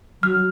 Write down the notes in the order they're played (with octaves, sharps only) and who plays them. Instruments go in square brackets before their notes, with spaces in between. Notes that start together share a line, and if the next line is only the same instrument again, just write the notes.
[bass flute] F#3 [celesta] F6